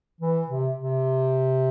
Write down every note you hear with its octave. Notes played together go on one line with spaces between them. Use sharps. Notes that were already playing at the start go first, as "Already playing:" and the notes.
E3
C3
C3